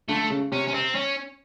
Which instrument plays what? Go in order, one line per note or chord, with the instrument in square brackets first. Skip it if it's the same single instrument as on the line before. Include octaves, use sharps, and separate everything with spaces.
[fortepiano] D3 [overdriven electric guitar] A3
[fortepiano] C#3
[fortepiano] C3 [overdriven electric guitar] C#4
[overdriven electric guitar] C#4
C4
C#4